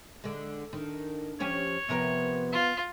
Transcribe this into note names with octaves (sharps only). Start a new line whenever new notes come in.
D3 G#3
D#3 D4
F3 C#4 G4 C#5
C3 F3 B3 A#4
F4